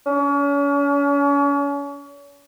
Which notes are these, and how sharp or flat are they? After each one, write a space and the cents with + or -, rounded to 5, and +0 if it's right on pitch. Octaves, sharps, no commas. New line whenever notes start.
C#4 +40